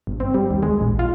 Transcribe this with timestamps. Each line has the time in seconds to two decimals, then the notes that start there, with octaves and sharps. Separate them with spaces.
0.07 G1
0.20 C4
0.34 G3
0.51 D#2
0.63 G#3
0.81 A#1
0.99 F4